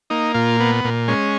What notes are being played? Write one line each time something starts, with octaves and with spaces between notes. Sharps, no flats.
A#3 D#4
A#2 F4
B3
A#2
G#3 C#4